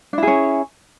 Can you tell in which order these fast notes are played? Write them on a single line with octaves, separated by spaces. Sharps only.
D4 E4 G#4 C#4